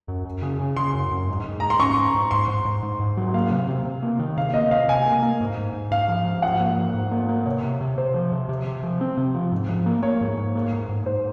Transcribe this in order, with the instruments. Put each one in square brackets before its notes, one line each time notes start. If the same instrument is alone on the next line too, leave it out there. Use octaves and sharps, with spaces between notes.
[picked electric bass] F#2
F#2
C#3
C#3
[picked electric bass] C#3 [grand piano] C6
[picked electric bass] F#2
F#2
G#2
G#2
[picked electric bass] G#2 [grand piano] A#5
[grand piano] C6
[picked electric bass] C#4 [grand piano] C#6
[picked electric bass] G#2
G#2
[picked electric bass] G#2 [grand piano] C6
[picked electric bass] G#2
G#2
G#2
G#2
F#3
[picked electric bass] A#3 [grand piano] F5
[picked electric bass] C3
C3
C3
A#3
D#3
[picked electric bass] C3 [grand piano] F5
[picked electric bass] A#3 [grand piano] D#5
[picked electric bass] C3 [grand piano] F5
[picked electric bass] C3 [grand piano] G#5
[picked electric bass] A#3
A#3
G#2
G#2
G#2
[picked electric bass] G#2 [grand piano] F5
[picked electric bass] F3
G#2
[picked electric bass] F3 [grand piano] F#5
[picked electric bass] A#3
G#2
G#2
A#3
A#3
[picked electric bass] C3 [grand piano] C#5
[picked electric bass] C3
C3
[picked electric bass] C3 [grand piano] C5
[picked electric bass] F3
C3
C3
C3
F3
C4
C3
F3
G#2
F3
A#3
[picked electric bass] A#3 [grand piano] C#5
[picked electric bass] G#2
G#2
A#3
G#2
G#2
[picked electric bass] G#2 [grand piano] C5